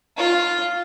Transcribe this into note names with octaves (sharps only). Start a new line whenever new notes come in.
F4